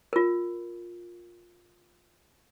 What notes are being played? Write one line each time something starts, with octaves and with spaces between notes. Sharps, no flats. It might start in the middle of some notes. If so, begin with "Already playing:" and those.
F4 A#4